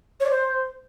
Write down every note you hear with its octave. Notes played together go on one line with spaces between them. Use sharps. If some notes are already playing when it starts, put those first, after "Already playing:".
C#5
D5
C5